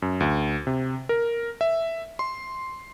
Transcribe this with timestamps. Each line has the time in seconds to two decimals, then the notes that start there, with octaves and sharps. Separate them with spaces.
0.02 F#2
0.20 D2
0.67 C3
1.09 A#4
1.61 E5
2.19 C6